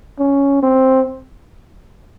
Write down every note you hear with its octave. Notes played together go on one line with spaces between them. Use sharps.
C#4
C4